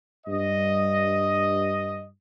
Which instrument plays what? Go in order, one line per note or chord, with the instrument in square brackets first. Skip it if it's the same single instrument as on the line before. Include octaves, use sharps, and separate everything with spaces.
[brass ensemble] G2 D#5